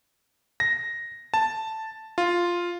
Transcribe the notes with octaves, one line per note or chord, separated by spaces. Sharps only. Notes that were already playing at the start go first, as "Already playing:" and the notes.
A#6
A5
F4